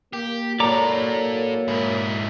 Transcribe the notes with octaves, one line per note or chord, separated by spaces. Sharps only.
A#3 G4
F#3 A#3 A4 C#5 D5 A#5 D6
G#2 E4